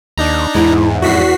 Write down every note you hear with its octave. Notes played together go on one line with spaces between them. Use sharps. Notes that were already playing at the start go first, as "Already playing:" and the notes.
D#2 D4 D#4 A#5
E2 G#2 E4
F2 G#2 E4 F#4 B6 C7